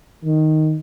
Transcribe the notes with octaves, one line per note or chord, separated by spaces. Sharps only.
D#3